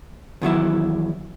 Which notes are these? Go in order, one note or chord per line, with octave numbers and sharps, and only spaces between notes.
E2 D#3 F#3 E4